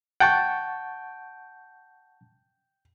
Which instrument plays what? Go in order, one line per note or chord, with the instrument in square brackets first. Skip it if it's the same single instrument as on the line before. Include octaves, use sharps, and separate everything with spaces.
[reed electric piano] F#5 A5 C#6 [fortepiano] G5